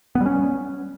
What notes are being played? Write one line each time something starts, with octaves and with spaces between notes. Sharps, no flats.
B3
G3
C#4